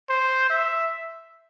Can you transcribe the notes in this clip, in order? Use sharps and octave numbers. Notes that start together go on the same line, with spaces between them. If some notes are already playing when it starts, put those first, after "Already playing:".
C5
E5